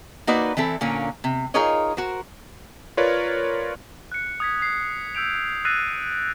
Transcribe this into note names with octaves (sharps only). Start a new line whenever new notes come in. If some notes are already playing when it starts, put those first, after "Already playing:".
A#3 D#4 F#4 B4 D5
E3 C4 E4 A4
A#2 D3 A#3 C#4
C3
D#4 F4 G#4 A#4 C#5 D#5
F#4 A#4 C5
F4 A#4 B4 C#5 D5
F#6 C#7
D#6 G#6 B6
D#6 C7
E6 G6 D7 F7
E6 F#6 A6 A#6 C7 D#7